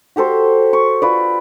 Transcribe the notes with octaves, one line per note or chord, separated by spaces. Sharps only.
F#4 G4 A4 C5
C#6
F4 B4 D5